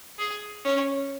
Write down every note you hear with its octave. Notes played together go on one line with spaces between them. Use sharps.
G#4
C#4